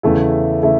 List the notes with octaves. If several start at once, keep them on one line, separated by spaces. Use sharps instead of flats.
E2 C#3 A3 E4
C#3 A3 E4